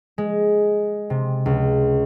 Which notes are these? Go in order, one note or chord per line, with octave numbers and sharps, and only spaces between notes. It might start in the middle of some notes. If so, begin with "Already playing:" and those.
G#3
C3
C#2